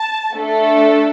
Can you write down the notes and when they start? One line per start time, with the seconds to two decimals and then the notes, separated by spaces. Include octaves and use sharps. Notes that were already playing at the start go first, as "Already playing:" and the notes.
Already playing: A5
0.35 A3 D4 A4